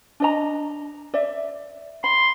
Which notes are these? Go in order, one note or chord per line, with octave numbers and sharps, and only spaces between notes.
D4 D#5 A#5
D5 E5
B5 C6